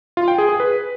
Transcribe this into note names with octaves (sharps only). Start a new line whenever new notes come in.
F4
G5
G#4
G#4
B4